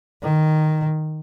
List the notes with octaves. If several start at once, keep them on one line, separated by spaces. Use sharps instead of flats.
D#3